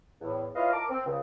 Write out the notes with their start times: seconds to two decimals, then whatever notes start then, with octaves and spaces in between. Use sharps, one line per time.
0.21 E2 A2
0.56 E4 F4 B4 C#5 D#5 F5
0.73 A#4 A5 D6
0.90 C4
1.06 C#2 C#3